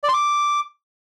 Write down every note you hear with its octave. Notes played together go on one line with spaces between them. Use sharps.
D5
C6
D6